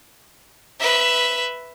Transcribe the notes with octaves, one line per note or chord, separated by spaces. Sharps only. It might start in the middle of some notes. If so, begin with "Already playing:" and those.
B4 E5